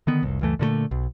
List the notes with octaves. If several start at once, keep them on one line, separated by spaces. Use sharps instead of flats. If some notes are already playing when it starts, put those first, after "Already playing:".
D3 D#3 B3
F1 C2
C#2 F#2 E3 A3
A#2 D3 F3 A3
B1